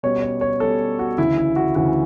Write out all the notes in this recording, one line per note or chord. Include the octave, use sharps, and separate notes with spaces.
B2 G3 C#4 C#5
C#5
C#5
B2 G3 C#4 A4
F#4
D2 C#3 E3 E4
E4
F#4
D2 C#3 E3 F#4